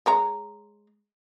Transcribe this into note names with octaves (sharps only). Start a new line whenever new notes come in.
G#3 C#5 A#5